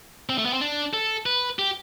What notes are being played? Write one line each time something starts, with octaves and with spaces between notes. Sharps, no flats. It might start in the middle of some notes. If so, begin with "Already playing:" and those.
C4
A3
B3
C4
D4
A4
B4
G4